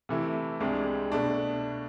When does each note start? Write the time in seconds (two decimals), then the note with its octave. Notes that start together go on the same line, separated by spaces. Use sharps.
0.09 C3 E3 A3 E4
0.61 C2 C3 G#3 D4
1.12 B2 A3 D4